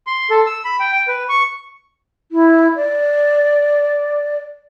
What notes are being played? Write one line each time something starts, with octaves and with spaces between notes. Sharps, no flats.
C6
A4
E6
B5
G5
G5
B4
C#6
E4
D5